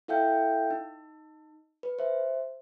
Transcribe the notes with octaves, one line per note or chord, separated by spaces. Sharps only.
E4 A4 E5 F5 G5 G6
D#4
B4
C5 E5